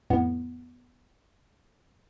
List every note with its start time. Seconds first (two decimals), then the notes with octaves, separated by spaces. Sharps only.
0.10 F2 A2 B3